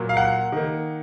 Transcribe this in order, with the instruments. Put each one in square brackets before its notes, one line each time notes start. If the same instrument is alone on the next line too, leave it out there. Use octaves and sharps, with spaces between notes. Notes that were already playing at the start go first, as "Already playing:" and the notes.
Already playing: [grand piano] A#2 F#3 A#3
F5
F#5
D#3 A#3